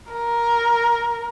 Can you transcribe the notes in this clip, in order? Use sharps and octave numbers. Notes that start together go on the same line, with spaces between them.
A#4